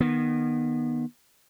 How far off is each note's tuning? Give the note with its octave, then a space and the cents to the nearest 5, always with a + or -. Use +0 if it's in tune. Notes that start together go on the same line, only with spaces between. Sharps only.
D#3 -25 B3 -25